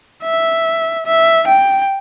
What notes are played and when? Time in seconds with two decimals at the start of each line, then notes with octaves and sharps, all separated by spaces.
0.23 E5
1.06 E5
1.47 G5